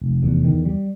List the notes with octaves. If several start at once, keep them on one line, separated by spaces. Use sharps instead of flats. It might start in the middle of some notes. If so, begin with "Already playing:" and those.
F1
E2
D#3
G3